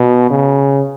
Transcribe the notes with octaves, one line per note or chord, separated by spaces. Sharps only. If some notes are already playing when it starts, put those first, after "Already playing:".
Already playing: B2
C#3